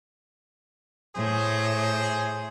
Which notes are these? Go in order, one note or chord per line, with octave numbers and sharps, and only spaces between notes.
A2 G#4 C5